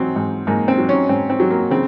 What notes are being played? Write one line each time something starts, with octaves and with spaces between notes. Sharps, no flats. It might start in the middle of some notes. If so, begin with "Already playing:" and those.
Already playing: G#2 F#3 C4
G#2
G#2 A#3
C4
F#3
C#4
G#2 C4
C4
F#3
A#3
C#3 C4